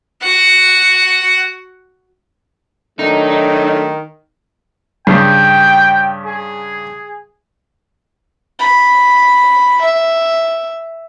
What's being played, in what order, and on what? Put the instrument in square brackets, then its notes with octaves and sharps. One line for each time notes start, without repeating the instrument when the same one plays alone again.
[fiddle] F#4 F#5
[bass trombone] D#3 [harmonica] F#3 A3 D4 [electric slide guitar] D#4
[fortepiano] G2 C#3 [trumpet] G5
[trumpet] G#4
[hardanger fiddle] B5
E5